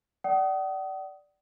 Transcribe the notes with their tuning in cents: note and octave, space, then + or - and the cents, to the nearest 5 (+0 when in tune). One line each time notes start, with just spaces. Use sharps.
D5 +0 F#5 +45 D#6 +10